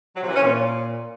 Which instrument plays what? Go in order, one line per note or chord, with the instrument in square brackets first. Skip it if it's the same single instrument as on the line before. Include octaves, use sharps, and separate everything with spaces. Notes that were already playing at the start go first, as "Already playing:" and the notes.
[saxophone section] F#3
C3
E3
C#4
A#2